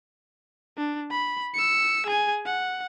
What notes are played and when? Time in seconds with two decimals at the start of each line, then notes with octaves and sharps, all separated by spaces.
0.77 D4
1.11 B5
1.54 E6 C#7
2.06 G#4 G#5
2.46 F#5